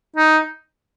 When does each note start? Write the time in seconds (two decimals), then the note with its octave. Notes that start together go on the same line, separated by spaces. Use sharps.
0.16 D#4